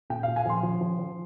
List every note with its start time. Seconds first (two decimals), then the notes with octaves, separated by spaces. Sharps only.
0.10 A#2 G5
0.23 F5
0.28 A#2
0.36 G#5
0.45 F3 C6
0.63 F3
0.81 F3
0.99 F3